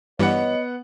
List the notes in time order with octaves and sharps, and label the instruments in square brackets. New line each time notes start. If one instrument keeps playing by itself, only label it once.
[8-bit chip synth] G2 E3 G3 [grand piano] B3 F#5 [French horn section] C#5 D#5